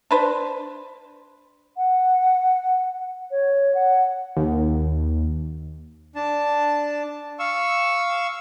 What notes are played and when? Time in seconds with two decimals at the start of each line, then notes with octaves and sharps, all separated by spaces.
0.11 D4 B4 C5
1.77 F#5
3.31 C#5
3.75 F#5
4.37 D#2
6.15 D4 A5
7.39 F5 C#6 E6